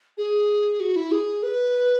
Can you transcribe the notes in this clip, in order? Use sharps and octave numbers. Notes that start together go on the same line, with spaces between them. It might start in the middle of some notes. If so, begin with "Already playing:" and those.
G#4
F#4
E4
G#4
B4